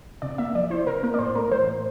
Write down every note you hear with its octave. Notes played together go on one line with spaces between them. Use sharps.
C3 D5
A#3 E5
F3 D5
E4 C5
C3 A#4
A#3 A#4
D5
A2 C5
A3 A#4
E3 C5
A2